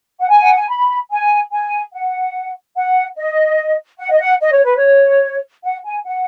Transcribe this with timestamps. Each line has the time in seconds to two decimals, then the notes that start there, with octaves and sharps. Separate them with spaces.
0.20 F#5
0.28 G#5
0.41 F#5
0.55 G#5
0.69 B5
1.11 G#5
1.51 G#5
1.93 F#5
2.76 F#5
3.17 D#5
3.99 F#5
4.10 D#5
4.20 F#5
4.41 D#5
4.52 C#5
4.64 B4
4.77 C#5
5.64 F#5
5.84 G#5
6.05 F#5